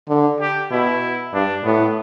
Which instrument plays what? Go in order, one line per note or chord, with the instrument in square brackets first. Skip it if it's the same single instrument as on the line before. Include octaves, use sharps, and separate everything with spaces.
[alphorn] D3
[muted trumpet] G4
[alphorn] B2 [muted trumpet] E4
[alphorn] G2 [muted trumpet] D4
[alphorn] A2 [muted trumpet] B3